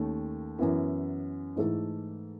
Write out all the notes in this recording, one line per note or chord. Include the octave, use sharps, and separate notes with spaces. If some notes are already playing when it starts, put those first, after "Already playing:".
Already playing: D#2 D#3 A3 C#4
F#2 E3 B3 E4
G#2 E3 A3 E4 A4